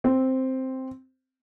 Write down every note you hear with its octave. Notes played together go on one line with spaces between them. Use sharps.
C4